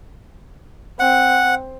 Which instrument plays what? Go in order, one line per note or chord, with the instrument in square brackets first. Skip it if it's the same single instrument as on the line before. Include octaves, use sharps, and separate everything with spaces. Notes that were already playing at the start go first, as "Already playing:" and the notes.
[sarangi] C4 [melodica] F#5